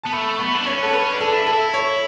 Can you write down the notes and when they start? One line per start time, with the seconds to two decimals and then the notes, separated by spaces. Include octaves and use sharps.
0.03 B3 A5
0.13 A3 B5
0.35 C#6
0.39 B3 B5
0.55 D4
0.67 C#4 C#5
0.83 B3 A4
0.93 C#4 B4
1.13 D4
1.21 A4
1.33 E4
1.47 A4
1.53 E4
1.74 C#5